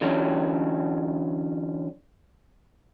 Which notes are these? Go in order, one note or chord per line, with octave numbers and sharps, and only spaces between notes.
D3 E3 F#3 C#4